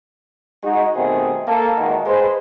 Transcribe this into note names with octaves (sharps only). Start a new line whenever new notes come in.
G#3 D#4 F#4
B2 D#3 G3 A3 C4 G#4
A#3 A4
A#2 D#3 E3 G#3 A#3 F#4
G#3 B4 C5